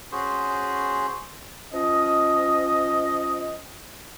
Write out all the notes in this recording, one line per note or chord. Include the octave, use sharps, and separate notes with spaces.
C#4 F#4 G#4 C5
F3 C#4 D#5